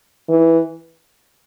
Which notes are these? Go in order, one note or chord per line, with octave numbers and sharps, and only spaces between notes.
E3